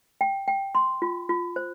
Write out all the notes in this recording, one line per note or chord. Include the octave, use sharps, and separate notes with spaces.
G5
G5
C6
F4
F4
C5